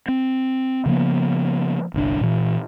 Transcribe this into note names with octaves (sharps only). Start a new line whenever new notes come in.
C4
C#3 F3 A#3 B3
G1 C2 D4
A#2 E3